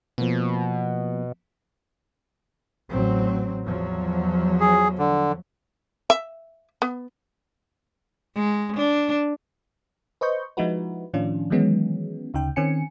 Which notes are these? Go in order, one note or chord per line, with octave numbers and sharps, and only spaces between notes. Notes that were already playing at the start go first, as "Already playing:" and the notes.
B2 F3 A#3 B3
A1 F#3 C4
E2 F3 F#3
G#4
D3
E5
B3
G#3
D4
B4 C5 D#5 C#6 G6
F3 G#3 D#4 E4 F#4 B4
A2 D#3 F3 C#4 D4 F4
D#3 E3 F#3 G#3 B3 C#4
D2 C#3 D#4 G5
D#3 C4 C#4 G#5 C#7